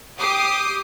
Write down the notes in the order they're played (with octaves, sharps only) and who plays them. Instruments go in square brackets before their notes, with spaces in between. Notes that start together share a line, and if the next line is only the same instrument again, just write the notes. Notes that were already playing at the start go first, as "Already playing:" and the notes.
[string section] G4 D6 D#6 C7